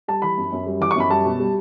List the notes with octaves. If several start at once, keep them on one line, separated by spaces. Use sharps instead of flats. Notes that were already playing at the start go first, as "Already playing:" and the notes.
G3 A5
E3 B5
F#2
F#2
G3
E3 D6
C#6
F#2 B5
G3 A5
B2
G3